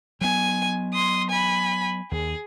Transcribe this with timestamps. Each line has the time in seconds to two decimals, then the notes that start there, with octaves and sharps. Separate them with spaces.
0.21 F#3 B3 G#5
0.93 C6 D#6
1.30 G#5 B5
2.11 D#2 G#4